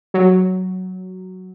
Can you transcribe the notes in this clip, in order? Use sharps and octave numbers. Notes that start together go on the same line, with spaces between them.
F#3